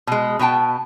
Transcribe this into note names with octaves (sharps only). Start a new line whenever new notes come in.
B2 G#3
B2 B3 G5 A5